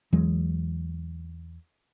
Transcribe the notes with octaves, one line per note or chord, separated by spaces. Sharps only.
E2 E3 F#3 G#3